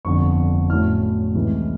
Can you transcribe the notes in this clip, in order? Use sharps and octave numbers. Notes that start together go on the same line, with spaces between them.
G1 F2 D3 C#6
A2 F#3 A3 C#4 E4 F6
C#2 C3 E3 A3